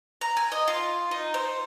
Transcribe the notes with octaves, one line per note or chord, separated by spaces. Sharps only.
A#5
G#5
D#5
F4
D#4
C5